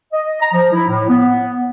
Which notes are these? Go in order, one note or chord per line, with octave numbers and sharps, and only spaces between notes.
D#5
A#5
F3
E4
A2
B3